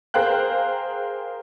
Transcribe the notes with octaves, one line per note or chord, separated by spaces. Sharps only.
G#4 A#4 C5 F5 G5 F#6